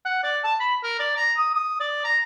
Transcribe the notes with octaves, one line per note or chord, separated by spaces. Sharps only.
F#5
D5
A5
B5
A#4
D5
A#5
D#6
D#6
D5
A#5